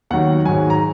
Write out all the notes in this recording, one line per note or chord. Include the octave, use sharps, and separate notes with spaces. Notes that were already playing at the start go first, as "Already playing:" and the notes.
D#2 D#3 F#3 F#5
G#2 D#3 F#3 G#5
A#5